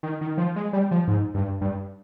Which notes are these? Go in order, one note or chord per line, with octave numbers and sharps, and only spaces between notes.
D#3
D#3
F3
G#3
G3
F3
G#2
G2
G2